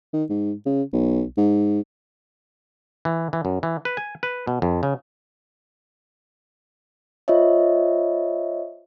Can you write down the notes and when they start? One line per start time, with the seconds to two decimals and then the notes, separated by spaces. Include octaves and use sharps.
0.14 D#3
0.29 G#2
0.66 C#3
0.93 B1
1.37 G#2
3.05 E3
3.33 E3
3.45 F#2
3.63 E3
3.85 B4
3.97 G#5
4.23 B4
4.47 B2
4.62 F2
4.83 C#3
7.28 F4 C5 C#5 D#5 E5